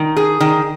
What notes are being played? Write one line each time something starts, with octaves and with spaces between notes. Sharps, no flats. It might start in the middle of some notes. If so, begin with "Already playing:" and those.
Already playing: D#3
G#4
D#3